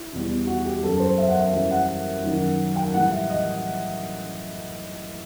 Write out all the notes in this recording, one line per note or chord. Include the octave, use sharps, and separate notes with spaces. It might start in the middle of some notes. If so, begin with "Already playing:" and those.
Already playing: E4
E2 B2 G3
F#4
G4
F#2 F#3 A4
C5
E5
F#5
E5
F#2 E3 G3 E5
F#5
F#2 D#3 F#3
G5
A2 E3 G3 F#5
E5
D#5